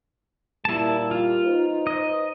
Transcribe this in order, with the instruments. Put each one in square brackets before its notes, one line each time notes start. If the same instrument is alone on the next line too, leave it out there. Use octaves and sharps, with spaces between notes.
[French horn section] A#2 G3 A#3 [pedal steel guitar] E4 A5
[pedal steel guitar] F4
[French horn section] D#4 B4 C5
[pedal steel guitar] D#5